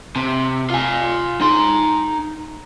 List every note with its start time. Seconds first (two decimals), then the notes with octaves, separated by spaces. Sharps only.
0.16 C3
0.70 F4 G#5
1.40 D#4 C6